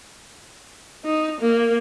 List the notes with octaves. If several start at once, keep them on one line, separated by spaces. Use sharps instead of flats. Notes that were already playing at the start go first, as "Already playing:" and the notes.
D#4
A#3